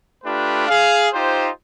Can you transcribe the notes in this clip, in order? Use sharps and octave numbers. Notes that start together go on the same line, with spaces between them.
A3 D4 F4 G4 B4
G#4 F5
D#4 F4 G4 C5